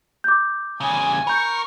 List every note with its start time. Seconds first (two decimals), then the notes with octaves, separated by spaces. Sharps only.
0.24 D6 G6
0.81 E2 C#3 G#5
1.27 A#4 B5 C#6 G6